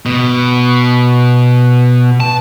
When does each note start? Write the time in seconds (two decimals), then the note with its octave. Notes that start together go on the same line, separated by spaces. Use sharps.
0.06 B2
2.20 A5